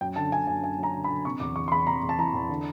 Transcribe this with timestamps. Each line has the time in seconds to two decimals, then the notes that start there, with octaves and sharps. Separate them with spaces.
0.01 F#2 G5
0.16 D3 A5
0.32 D3 G#5
0.47 F#2 G#5
0.63 F#2 G#5
0.79 F#3 A#5
0.94 D3
1.04 B5
1.10 D3
1.25 C3 C#6
1.40 E2 D6
1.56 E2 C#6
1.68 C6
1.72 E2 B5
1.87 C3 A#5
2.03 E2
2.09 A5
2.18 E3 A#5
2.34 E2
2.49 D3